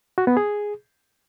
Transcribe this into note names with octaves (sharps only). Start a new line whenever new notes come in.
F#4
B3
G#4